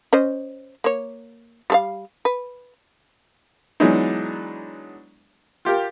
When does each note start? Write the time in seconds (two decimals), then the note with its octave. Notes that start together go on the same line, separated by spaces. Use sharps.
0.13 C#4 C5 D#5
0.84 A#3 C#5
1.70 G3 A4 F5
2.25 B4
3.80 E3 F#3 G#3 B3 D4 D#4
5.65 F4 G4 A#4